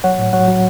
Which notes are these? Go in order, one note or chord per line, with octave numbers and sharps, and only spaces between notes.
F#3 C#5 F#5
A2
F#3 C#5 F#5
F#3